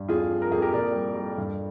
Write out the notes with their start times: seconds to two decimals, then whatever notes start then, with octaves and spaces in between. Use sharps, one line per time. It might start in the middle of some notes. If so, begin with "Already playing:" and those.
Already playing: G2
0.09 F2 F4 G#4
0.31 F3
0.42 A#4
0.51 F2 G#4
0.62 G4 A#4
0.73 A#2 A#4 D5
0.94 G3
1.15 G3
1.38 G2